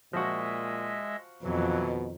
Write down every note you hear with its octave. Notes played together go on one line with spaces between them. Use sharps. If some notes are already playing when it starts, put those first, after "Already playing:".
A#2 F3 G#3 F#4 D#5 E5
F2 B2 D#3 E3 F#3